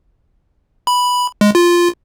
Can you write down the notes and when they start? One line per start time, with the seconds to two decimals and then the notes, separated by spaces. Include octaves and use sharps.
0.87 B5
1.41 G#3
1.55 F4